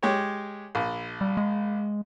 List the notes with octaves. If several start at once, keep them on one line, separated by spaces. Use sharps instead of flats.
G#3 G4 C#5
A#1
G3
G#3